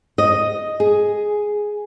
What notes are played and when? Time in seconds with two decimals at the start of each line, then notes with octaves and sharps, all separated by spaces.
0.18 D#5
0.80 G#4